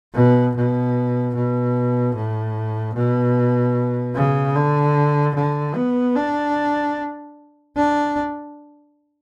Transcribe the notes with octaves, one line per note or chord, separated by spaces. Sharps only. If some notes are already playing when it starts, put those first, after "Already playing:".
B2
B2
B2
A2
B2
C#3
D3
D3
B3
D4
D4